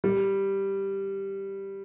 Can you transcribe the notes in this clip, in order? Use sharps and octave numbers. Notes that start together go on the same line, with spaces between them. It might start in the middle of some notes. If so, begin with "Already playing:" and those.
G3